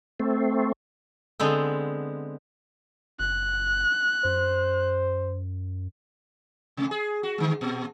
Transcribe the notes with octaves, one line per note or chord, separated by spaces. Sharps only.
A3 C4
D3 G#3 B3 C4
F#1 F#6
F#2 C5
C3 A3
G#4
F#4
D3 G#3
A#2